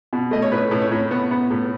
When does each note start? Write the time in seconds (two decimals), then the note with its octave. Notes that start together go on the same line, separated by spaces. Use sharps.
0.13 B2
0.31 A3 D#5
0.42 C#5
0.52 A2 B4
0.71 A2
0.82 C#5
0.92 A2
1.11 B3
1.31 B3
1.51 A2